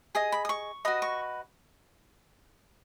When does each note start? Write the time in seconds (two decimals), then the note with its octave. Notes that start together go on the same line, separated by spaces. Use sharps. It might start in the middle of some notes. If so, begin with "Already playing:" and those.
0.15 G#4 D#5 D#6
0.32 B5
0.45 D#6
0.49 C#6
0.85 F#4 B4 D#5 D#6
1.02 C#6